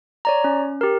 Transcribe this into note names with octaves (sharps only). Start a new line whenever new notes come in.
C#5 D5 A#5
C#4
G4 A#4